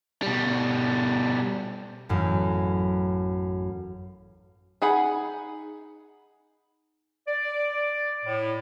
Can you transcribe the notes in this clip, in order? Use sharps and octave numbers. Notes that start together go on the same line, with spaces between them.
B2 G3
A1 F#2 E3
D#4 G#4 F#5 B5
D5
A2